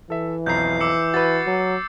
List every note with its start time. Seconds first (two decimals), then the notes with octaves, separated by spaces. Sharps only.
0.10 E3 A4 E5
0.46 B1 F2 A#5 G6 C7
0.81 D6 E6 C#7
1.14 F#4 B4 A6
1.47 F#3